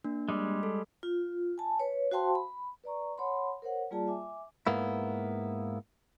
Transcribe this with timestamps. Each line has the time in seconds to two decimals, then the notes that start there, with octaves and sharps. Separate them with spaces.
0.04 A#3 D4
0.29 G3 G#3
0.63 A4
1.03 F4
1.58 G#5 A5
1.80 B4 C#5
2.11 F#4 C5 F5 G5 A5 C6
2.35 B5
2.84 B4 D5 A#5 C#6
3.18 C#5 F#5 A5 B5 C6
3.62 A#4 C5 C#5 F#5
3.91 G3 A#3 F4 G#4 D5 A5
4.07 E5 G#5 D6
4.67 G#2 A#3 B3 E4